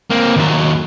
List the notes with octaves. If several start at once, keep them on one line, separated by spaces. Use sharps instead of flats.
A#3 C4
D#2 F#3